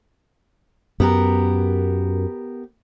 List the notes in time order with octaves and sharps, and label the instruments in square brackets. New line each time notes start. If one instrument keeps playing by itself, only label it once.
[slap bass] F#2 [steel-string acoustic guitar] B3 G4 A#4